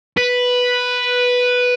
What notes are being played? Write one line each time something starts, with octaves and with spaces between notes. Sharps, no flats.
B4